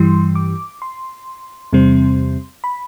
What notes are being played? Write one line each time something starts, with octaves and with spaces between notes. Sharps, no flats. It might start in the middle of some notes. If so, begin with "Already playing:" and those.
Already playing: G2 E3 G3 C6
D6
C6
E2 C3 G3 C4
B5